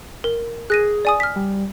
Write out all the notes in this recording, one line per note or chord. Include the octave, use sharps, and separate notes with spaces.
A#4
G#4 F#6 A#6 D#7
D5 G#5 D#6
F6 B6
G3